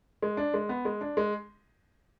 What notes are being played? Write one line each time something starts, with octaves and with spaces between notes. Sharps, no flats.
G#3
D4
G#3
B3
G#3
D4
G#3